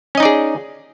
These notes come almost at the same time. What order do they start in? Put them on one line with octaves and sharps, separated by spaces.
C#4 D#5 D#4 D5 G#4